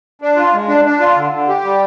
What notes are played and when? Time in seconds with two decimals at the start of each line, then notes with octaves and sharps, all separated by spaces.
0.22 D4
0.37 F4
0.53 G#3
0.68 D4
0.85 D4
1.00 F4
1.16 D3
1.32 D3
1.48 G4
1.64 G3